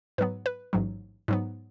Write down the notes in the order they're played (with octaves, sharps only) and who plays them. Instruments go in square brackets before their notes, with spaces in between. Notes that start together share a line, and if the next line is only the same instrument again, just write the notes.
[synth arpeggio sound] G#2 F#3 B3 B4
B4
A1 G#2 F#3
G#2 F#3 B3